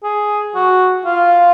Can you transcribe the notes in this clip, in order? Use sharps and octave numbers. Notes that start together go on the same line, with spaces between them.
G#4
F#4
F4